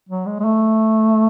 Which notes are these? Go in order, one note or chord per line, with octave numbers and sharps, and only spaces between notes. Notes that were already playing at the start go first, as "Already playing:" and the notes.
F#3
G#3
G#3
A3